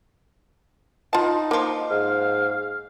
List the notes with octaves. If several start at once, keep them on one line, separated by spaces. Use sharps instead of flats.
D#4 F4 A5
F3 A#3
G#2 F5